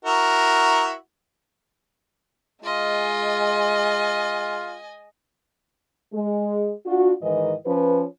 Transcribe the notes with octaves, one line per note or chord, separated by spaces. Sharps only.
E4 F#4 A#4
G#3 F4 D#5 G#5
G#3
D4 F4 F#4
G#2 D#3 E3 D#5
F3 C#4 B4